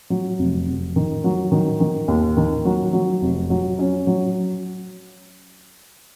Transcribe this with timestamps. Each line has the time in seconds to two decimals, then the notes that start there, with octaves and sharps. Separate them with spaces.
0.10 F#3
0.39 F1
0.66 F1
0.96 D#3
1.24 F#3
1.52 D#3
1.80 D#3
2.08 D#2
2.37 D#3
2.65 F#3
2.93 F#3
3.21 F1
3.50 F#3
3.79 C#4
4.07 F#3